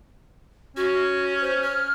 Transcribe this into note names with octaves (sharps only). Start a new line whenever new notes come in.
C#4 F#4
C5
F6